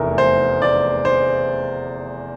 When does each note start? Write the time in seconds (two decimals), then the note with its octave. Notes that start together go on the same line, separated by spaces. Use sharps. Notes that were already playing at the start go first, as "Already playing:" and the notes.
Already playing: F1 E2 E3 A3 A#4
0.18 C5
0.62 D5
1.05 C5